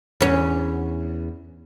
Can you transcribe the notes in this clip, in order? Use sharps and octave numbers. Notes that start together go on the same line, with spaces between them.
E2 C#4